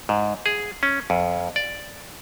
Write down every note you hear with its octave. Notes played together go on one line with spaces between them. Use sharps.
G#2
G#4
C#4
F2
D5